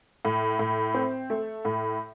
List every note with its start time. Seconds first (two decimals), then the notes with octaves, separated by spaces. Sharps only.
0.25 A2
0.59 A2
0.94 C4
1.30 A3
1.65 A2